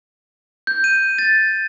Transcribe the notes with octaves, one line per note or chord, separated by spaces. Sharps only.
G6
D#7
A6